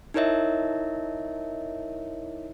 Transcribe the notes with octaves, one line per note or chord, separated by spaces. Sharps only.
D#4 E4 A#4 C#5 D#5 E5